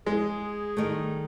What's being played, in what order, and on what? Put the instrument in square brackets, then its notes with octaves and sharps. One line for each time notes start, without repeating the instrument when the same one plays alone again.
[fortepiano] G#3 [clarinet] G#4
[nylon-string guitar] D#3 G3 A3